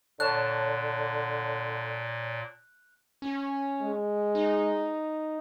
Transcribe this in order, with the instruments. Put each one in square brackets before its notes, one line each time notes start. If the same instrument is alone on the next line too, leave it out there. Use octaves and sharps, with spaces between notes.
[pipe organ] A#2 [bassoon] D3 [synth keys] C#5 A5 [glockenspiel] F#6
[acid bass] C#4
[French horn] G#3
[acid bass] D#4